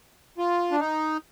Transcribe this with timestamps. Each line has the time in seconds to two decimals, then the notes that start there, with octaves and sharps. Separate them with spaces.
0.38 F4
0.71 D4
0.79 D#4